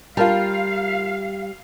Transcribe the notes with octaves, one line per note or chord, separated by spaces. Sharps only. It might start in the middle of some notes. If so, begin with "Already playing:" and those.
G3 F4 A#4 F5 A5